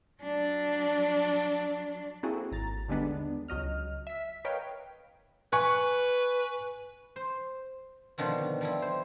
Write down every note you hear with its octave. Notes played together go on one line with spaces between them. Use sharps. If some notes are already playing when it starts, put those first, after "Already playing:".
F#3 D4
A#3 C4 E4 F#4 G#4 A4
G#1 A#5 A6
D#2 D3 G3 G#3 B3 D4
C#2 F#3 D#5 F6
E5 B6
A#4 B4 C#5 D#5 F5 G5
B4 G#5 C#6
C5
B2 D3 D#3 F3 C4
F3 G3 E4
C5